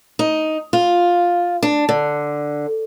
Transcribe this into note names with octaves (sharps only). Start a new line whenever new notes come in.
D#4
F4
D4
D3